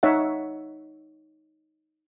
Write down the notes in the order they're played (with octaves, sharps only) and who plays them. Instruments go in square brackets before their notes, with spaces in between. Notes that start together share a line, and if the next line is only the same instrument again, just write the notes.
[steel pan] D#4 C#5 E5 F#5